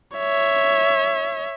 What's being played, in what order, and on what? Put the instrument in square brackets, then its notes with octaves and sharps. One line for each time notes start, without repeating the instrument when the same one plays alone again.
[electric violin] C#5 E5